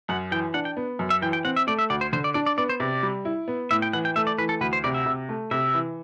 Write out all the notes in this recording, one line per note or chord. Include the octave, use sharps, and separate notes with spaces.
F#2 F#5
E3 G5
D4 F#5
G5
B3
F#2
E5
E3 G5
G5
C4 F#5
E5
A3 D5
E5
D2 D5
C5
D3 C5
D5
D4 D5
D5
B3 D5
C5
C3 D5
G3
E4
B3
A2 E5
G5
E3 F#5
G5
A3 E5
D5
E3 B4
A4
D2 B4
C5
C3 D5
E5
C3
A3
C3 E5
E3